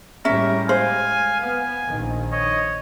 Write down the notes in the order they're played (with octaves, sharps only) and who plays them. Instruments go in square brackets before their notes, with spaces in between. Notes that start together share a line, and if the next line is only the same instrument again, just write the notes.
[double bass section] A2 G3 G#3 [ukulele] C#4 E5 [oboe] A#4
[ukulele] C5 [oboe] F5 [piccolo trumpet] G#5
[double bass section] B3 [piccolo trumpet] G#5
[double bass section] A#1 D#3
[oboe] C#5 [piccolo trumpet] D#5